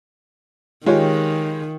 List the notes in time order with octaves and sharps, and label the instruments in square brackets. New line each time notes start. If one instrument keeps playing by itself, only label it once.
[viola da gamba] D#3 [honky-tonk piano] G#3 G4 [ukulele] F4 C#5